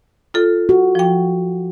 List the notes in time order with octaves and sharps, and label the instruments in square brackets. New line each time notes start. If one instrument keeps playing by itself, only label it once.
[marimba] F4 A4
[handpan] F#4
[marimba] F3 G5